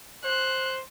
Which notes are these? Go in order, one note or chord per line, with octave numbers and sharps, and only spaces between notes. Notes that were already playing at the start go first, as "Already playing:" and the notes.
C5 F#6